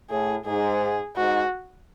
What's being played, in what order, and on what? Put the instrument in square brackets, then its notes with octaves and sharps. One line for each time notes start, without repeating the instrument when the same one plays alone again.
[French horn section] A2 [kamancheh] G#4
[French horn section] G#2 [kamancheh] G#4
[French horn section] G#2 [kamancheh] F#4